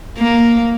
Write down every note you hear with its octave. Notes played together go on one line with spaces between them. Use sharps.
A#3